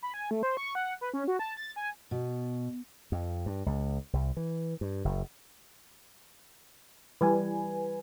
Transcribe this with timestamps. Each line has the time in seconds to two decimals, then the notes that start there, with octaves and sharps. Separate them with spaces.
0.02 B5
0.14 G#5
0.31 A3
0.43 C5
0.57 C#6
0.75 F#5
1.01 B4
1.14 C#4
1.28 F#4
1.39 A5
1.57 A6
1.76 G#5
2.11 B2
3.12 F2
3.46 G2
3.66 C#2
4.13 C2
4.37 E3
4.81 G2
5.05 F#1
7.21 E3 G3 B4 G#5